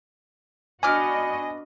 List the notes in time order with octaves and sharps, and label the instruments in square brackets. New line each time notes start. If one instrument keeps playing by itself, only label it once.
[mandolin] B3 D6 F6 [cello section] D4 F#4 D#5 [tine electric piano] G#5